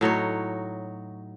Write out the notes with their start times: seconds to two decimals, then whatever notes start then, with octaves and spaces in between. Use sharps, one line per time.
0.01 A2 F#3 D#4 C#5